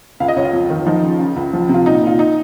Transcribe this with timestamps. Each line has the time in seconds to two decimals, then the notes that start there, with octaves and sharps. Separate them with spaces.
0.20 C#2 F5
0.28 D#5
0.36 C#2 C#5
0.45 F4
0.53 F2
0.70 D#3
0.86 F3 D#4
1.03 C#3
1.19 C#3
1.36 C#2
1.53 F3
1.69 C3
1.74 F4
1.86 A#2 D#4
2.03 A#2 F4
2.19 D#4